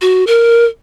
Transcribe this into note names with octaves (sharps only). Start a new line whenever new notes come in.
F#4
A#4